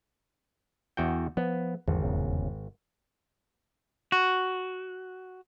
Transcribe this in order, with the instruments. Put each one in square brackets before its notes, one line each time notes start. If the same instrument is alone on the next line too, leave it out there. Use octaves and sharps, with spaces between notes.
[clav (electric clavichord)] E2 F#4 G5
[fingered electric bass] F3 [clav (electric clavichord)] B3
[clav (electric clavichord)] G#1 [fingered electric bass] E2 D3 F3
[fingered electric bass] F1 E2 C#3
[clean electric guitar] F#4